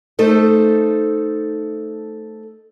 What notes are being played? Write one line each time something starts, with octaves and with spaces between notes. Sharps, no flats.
A3 D#4 A4 C5